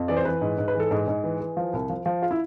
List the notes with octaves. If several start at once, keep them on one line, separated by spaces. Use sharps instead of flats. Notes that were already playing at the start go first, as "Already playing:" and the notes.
Already playing: F2
E3 D5
C5
E3 B4
G#2
G#2
B4
E3 A4
G#2 G#4
G#2
E3
E3
F3
C2
F3
F3
F4
E4